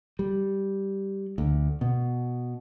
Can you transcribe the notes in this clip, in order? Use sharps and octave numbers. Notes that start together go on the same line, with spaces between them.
G3
D2
B2